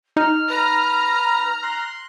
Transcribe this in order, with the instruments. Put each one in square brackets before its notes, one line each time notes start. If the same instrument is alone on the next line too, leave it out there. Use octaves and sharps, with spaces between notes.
[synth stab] D#4 [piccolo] F6
[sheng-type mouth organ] B4 [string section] A#5
[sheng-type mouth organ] C6 F#6